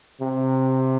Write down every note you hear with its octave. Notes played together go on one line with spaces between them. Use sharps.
C3